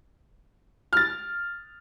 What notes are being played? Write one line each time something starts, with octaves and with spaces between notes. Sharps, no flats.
F6 A6